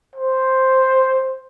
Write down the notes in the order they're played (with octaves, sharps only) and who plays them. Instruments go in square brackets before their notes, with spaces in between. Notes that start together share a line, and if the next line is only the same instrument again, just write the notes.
[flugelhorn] C5